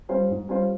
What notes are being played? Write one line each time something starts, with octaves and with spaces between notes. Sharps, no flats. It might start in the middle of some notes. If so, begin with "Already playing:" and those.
G3 C#4 F4 C5
G#2
G3 C#4 F4 C5